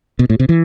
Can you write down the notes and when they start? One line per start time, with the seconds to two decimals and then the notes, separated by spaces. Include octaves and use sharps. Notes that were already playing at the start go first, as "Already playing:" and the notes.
0.19 B2
0.30 A2
0.40 C3
0.49 E3